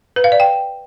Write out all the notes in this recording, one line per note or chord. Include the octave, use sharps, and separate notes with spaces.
B4
F5
D5
G5